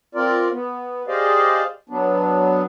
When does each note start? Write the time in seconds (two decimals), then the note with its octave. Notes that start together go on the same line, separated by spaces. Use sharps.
0.15 C4 F4 A#4 D5
0.52 B3
1.08 G4 G#4 C5 D5 D#5 F5
1.89 F#3 B3 D4